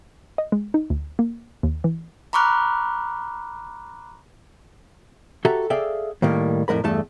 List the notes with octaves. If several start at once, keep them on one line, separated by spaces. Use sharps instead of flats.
D#5
G#3
D#4
D2
A#3
D#2
E3
A#5 B5 C#6 D6 F6 F#6
F#4 G4 A4 E5 A#5
G#4 A4 D5 E5 F5 G5
A2 D#3 G3 A#3
F2 A2 G#3 A#4 B5
E2 G2 A3 A4 A5